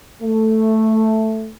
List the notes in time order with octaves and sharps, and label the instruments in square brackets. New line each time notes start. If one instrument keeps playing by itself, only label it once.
[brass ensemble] A3